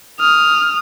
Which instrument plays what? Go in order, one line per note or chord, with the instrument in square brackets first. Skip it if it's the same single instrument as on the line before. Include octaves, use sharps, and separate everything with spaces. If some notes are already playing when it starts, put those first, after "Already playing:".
[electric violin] D#6 [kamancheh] F6